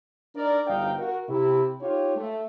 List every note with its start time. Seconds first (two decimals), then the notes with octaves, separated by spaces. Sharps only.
0.35 D4 D#4 A#4 D5
0.67 G1 D2 D#4 F5 G5
0.98 F#4 A#4
1.29 C3 E4 G4
1.81 D#4 F4 G4 C#5
2.16 A3